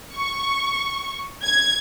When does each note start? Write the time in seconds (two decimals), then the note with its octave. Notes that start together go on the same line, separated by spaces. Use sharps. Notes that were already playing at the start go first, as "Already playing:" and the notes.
0.15 C#6
1.45 G#6